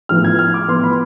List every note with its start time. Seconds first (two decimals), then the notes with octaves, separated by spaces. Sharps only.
0.09 A2 F3 B3 F6
0.24 G#6
0.39 F6
0.54 D6
0.68 A2 F3 B3 C6
0.84 B5